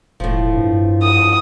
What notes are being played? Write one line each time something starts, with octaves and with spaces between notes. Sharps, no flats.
E1 A2 F3
G2
D#6